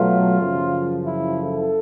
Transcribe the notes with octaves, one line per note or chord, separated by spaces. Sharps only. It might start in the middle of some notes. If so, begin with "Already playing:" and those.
Already playing: B2 F#3 A3 F4
F#2 C#3 F3
E4
A4